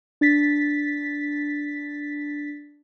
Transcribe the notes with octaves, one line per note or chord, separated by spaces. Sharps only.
D4 A6 B6